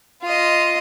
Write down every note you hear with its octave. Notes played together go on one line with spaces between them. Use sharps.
F4 D#5